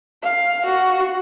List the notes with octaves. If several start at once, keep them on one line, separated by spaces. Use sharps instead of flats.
F5
F#4